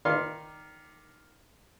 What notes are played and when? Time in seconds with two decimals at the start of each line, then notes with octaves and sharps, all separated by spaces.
0.05 D#3 D5 F5 C6